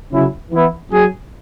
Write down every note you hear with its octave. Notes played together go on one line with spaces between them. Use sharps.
C#3 F#3 C#4 E4
E3 B3 E4
F#3 C#4 G#4